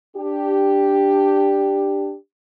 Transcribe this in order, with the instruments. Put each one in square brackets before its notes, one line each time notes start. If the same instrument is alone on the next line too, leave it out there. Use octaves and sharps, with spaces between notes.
[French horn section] D4 G4